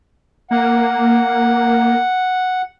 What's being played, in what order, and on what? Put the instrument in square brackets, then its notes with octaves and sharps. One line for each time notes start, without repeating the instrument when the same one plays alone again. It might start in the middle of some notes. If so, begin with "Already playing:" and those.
[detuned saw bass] A#3 [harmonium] F#5